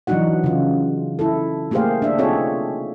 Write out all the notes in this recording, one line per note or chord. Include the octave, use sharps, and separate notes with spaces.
E3 F#3 D4 D#4 F#4 F#5
C#3 F4
E4 A4
A3 A#3 G4 G#4 C5 F5
D4 E5
C4 D#4 F4 G#4 A4 C#5